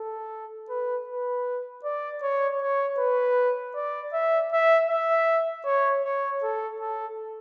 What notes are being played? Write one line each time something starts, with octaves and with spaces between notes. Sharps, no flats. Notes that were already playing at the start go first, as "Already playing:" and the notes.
Already playing: A4
B4
B4
D5
C#5
C#5
B4
D5
E5
E5
E5
C#5
C#5
A4
A4